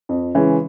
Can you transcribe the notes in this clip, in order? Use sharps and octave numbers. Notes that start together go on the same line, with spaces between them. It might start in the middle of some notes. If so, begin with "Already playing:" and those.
F2
C#3 E3 G#3 C#4